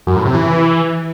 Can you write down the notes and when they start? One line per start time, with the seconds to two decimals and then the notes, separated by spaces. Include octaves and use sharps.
0.07 F#2
0.16 A2
0.25 C3
0.34 E3